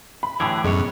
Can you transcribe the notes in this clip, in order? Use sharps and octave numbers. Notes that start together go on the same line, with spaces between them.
B5
A2 D3 E3 F#3 G4 G#4
F#2 B2 G#3 C#5